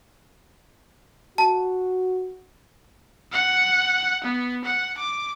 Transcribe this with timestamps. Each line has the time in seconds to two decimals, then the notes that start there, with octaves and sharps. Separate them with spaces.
1.38 F#4 A5
3.32 F#5
4.24 B3
4.64 F#5
4.97 D6